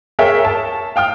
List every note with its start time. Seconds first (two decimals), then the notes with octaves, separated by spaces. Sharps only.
0.19 G#4 A#4 C#5 E5 F5 G5
0.45 A5
0.96 F5 G5 D#6 F6